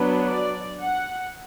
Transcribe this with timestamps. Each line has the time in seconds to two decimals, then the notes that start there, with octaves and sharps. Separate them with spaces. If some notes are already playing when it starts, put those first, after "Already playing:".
Already playing: F#3 B3 D4
0.27 D5
0.81 F#5